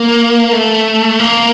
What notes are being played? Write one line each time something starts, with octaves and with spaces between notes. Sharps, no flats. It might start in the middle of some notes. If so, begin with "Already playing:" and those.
Already playing: A#3
A3
A#3